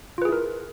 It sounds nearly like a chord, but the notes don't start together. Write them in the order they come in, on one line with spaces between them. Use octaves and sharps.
F4 B4 G#4 E4 A#4